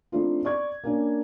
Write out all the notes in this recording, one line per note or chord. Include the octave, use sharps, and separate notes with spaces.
F3 A3 C4 D4 D#4 F4
D5 C#6 G#6
A#3 C#4 D4